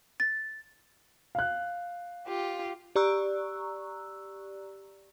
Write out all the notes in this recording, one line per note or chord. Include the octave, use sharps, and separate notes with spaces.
A6
F5 F#6
F4 G4
G4 D5 A#5 C#6 E6 F#6